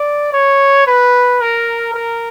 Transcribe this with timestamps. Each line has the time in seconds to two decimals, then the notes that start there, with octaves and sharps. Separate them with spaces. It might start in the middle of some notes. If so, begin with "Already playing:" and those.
Already playing: D5
0.33 C#5
0.87 B4
1.41 A#4
1.94 A#4